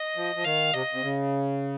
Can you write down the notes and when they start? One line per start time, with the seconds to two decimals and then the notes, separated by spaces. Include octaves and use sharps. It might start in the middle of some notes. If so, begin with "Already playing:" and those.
Already playing: D#5
0.16 F3
0.36 F3
0.44 D#3 F5
0.73 C3 D#5
0.93 C3
1.02 C#3